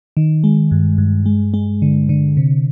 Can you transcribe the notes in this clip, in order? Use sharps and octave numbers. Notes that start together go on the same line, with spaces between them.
D#3
G#3
G2
G2
G#3
G#3
D3
D3
C3